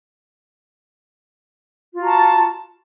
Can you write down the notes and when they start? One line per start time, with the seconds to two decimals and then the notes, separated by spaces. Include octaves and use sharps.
1.94 F4
1.98 F#4
2.03 A#5
2.07 A5